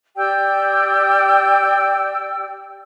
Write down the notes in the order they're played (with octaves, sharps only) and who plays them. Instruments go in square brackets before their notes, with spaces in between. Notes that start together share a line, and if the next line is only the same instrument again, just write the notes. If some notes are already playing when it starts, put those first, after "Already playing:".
[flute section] G4 D5 G5 E6